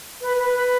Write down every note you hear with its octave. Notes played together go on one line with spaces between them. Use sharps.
B4
B4
B4